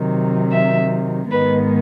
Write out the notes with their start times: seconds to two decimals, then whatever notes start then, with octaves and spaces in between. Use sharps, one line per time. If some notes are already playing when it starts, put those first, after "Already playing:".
Already playing: C3 D#3 F#3
0.52 E5
1.31 G#2 D#3 G#3 B3 B4